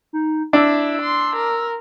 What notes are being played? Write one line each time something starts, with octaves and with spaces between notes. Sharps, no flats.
D#4
D4 E4 E6
C6
A#4